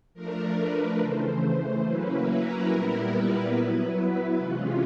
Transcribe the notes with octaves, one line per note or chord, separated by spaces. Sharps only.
F3 A3 D4 A#4
B4
C#3 E3 A3 C5
C5
F#3 A#3 C#4 E4 B4
A#4
A#2 G3 B3 E4
B4
F#3 B3 E4
C3 E3 G#3 C#4 F4